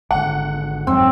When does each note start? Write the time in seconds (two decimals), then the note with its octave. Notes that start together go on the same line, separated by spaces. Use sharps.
0.11 G#1 D3 F#5
0.87 F2 G#2 F#3 C4